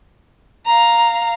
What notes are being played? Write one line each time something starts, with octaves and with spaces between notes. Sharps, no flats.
F5 A#5